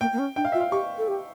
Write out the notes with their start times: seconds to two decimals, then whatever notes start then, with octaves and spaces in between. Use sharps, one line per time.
0.01 A#3 G5
0.13 A#3
0.19 C#4
0.36 D4 G5
0.45 F5
0.52 F4 E5
0.60 F5
0.71 G4 C#6
0.98 A4
1.08 G4